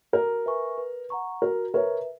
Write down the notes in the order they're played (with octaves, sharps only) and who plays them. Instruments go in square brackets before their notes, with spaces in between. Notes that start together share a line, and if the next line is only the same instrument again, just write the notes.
[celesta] F#4 [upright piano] A#4
[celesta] B4 E5 G#5 C#6
B4
F#5 A#5 C#6
[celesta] F#4 [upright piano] A#4
[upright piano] A#4 C#5 [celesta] B4 E5